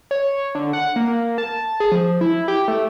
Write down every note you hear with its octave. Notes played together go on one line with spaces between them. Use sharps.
C#5
D3
F#5
A#3
A#3
A5
G#4
F3
E4
G4
A3